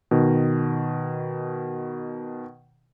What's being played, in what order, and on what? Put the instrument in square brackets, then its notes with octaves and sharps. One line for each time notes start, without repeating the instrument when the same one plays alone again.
[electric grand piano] B2 D#3